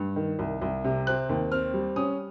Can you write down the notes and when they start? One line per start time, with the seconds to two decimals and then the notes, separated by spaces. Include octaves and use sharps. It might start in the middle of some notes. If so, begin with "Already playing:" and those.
Already playing: G2
0.16 D#3
0.39 C2
0.62 C2
0.84 C3
1.07 C4 F#6
1.29 D#2
1.51 C4 F6
1.74 G3
1.96 C#4 D#6